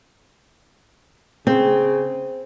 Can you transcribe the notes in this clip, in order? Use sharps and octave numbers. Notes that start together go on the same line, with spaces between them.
C#3 C4